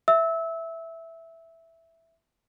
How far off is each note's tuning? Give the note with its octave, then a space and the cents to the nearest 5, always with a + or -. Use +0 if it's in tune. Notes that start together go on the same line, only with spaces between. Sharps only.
E5 +0 E6 -25